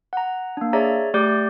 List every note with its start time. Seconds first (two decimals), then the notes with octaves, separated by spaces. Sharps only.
0.13 F#5 A#5
0.57 A#3 D4
0.73 G#4 C#5 D5 E5 A#5
1.14 A3 G4 D5 D6 G6